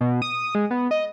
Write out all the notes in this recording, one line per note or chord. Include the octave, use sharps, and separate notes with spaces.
B2
D#6
G#3
B3
D#5